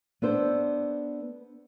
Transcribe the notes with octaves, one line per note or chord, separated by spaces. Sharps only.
B3 D4 A4 C5